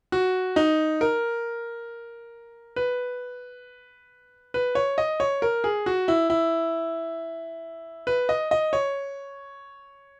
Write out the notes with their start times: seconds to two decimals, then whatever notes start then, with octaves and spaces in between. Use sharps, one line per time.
0.12 F#4
0.56 D#4
1.01 A#4
2.76 B4
4.54 B4
4.75 C#5
4.98 D#5
5.20 C#5
5.42 A#4
5.64 G#4
5.86 F#4
6.08 E4
6.30 E4
8.07 B4
8.29 D#5
8.51 D#5
8.73 C#5